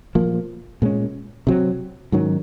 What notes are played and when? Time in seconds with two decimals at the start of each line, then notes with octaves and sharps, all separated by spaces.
0.15 A#2 F3 A#3
0.82 A#2 G#3 C#4
1.47 C3 F#3 C4
2.12 G#2 D#3 F#3 C#4